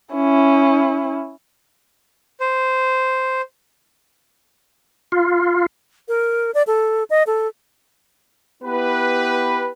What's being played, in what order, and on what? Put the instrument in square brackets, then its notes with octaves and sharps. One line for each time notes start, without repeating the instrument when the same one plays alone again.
[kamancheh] C#4 E4
[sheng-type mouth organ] C5
[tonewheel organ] F4
[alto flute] A#4
D5
A4
D#5
A4
[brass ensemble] B3 E4 G4 B4